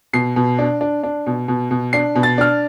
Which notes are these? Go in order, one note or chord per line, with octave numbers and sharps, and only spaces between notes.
B2 C7
B2
D4
D4
D4
B2
B2
B2
D4 C7
B2
A6
D4 F6